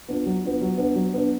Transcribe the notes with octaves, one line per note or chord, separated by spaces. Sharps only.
B3 D4 F4
F#3
B3 D4 F4
F#3
B3 D4
F#3
B3 D4